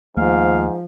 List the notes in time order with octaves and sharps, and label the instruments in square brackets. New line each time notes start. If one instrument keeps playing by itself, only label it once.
[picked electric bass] D#2 A3 A#3 [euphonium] G#2 [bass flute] F3 [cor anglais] F5